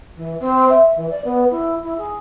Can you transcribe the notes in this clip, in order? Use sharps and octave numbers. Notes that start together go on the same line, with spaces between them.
E3
C4
E5
E3
D5
B3
E4
E4
G#4